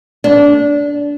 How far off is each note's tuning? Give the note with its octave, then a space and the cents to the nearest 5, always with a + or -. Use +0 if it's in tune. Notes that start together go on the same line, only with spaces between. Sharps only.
D4 -20